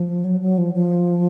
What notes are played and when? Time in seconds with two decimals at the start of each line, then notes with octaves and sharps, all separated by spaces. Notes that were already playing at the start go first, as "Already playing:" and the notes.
Already playing: F3
0.24 F#3
0.41 F#3
0.58 F3
0.74 F3